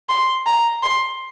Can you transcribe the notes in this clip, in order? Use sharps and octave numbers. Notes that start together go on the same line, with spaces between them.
C6
A#5
C6